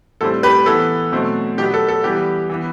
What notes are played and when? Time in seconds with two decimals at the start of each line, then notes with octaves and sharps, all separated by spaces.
0.21 A2 G3 C4 A4
0.43 G4 B4
0.66 E3 B3 A4
1.12 B2 F#3 A3 C4
1.58 B2 F#3 B3 G4
1.74 A4
1.89 A4
2.03 E3 G3 B3 G4
2.49 E3 B3